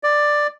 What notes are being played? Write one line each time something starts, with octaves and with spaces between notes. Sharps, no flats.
D5